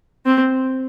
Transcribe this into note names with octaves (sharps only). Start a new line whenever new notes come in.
C4